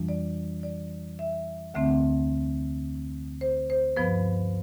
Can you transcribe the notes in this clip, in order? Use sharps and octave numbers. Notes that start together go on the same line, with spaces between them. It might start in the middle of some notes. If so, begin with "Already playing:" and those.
Already playing: F2 E3 G3 D4
D5
D5
E5
D2 D3 A3 C4 E5
C5
C5
G2 F3 B3 B4